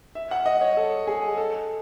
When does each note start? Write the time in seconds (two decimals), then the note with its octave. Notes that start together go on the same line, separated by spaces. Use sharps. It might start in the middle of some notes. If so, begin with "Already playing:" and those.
0.15 E5
0.31 F#5
0.46 D#5
0.61 C#5
0.77 A4
1.07 G#4
1.38 A4